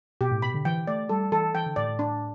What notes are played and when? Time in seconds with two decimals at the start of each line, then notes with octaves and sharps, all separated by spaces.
0.21 B2 G4
0.31 A2
0.42 B2 B5
0.54 D3
0.65 E3 G5
0.87 A3 D5
1.09 G3 A4
1.32 E3 A4
1.55 E3 G5
1.66 D3
1.76 A2 D5
1.88 A2
1.99 D4